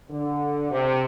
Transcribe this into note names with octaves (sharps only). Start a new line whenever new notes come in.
D3
C3